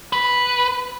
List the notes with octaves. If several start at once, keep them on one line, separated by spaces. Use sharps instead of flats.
B4